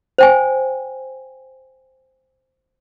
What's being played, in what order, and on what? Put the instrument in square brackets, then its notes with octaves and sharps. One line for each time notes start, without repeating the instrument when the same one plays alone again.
[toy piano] C5 G5 G#5